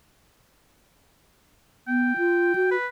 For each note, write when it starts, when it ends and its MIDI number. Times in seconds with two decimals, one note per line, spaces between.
1.88 2.13 59
1.88 2.69 79
2.17 2.53 65
2.55 2.76 66
2.71 2.87 71